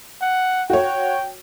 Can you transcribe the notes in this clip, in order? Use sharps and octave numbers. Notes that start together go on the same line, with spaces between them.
F#5
F#4 C#5 G5